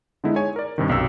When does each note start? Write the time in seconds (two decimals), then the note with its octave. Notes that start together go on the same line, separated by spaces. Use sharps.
0.24 D3 G#3 B3 D#4 E4
0.36 G#4 C#5 G#5
0.56 A#4 D5
0.78 G2 C3 D#3
0.89 B1 F#2 C3 G5 E6